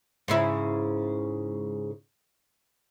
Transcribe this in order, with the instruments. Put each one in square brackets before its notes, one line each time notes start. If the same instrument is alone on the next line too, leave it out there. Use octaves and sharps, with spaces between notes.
[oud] G#2 C#3 E4